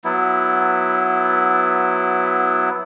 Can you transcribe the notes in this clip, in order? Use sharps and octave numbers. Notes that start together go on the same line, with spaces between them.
F#3 B3 E4